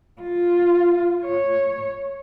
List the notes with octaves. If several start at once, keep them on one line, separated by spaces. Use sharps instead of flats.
F4
C#5